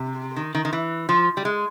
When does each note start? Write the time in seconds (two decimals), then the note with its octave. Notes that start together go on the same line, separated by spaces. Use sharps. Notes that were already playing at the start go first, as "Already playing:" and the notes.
Already playing: C3
0.36 D#3
0.55 D#3
0.65 D#3
0.73 E3
1.09 F3
1.37 G3
1.45 G#3